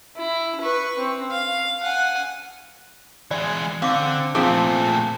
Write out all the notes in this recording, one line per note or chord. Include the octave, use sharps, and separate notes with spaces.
E4
B4 C#6
C4
F5
F#5 G#5
E3 G#3 D5
D3 C4 F5 D6
A#2 F3 A3 C4 G#4 A4 F5